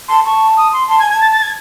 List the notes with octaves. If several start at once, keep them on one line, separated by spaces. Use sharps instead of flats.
A5 C6
A5 C#6
D#6
C6
A5 C6
G#5 G#6
G#6
A5
A6
A6
G#6